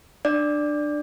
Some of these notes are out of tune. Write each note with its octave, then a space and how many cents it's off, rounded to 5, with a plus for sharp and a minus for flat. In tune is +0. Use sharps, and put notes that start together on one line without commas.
D4 +20 D5 +0